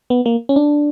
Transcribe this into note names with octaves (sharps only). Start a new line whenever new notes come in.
B3
A#3
C#4
D4